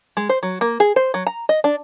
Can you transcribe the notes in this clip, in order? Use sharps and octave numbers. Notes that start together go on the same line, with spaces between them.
G#3
C5
F#3
A#3
G#4
C5
F#3
A#5
D#5
D4